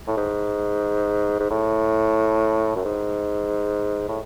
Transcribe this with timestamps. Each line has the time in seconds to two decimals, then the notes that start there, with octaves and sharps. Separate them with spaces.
0.08 A2
0.17 G#2
1.40 G#2
1.51 A2
2.76 F#2
2.85 G#2
4.09 A2